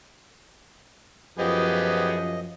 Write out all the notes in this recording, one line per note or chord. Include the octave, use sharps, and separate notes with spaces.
F#2 F3 B3 G4 G#4 D#5